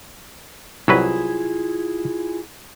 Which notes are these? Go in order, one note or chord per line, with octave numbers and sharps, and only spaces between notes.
C2 F#3 E4 F4 G#4 B4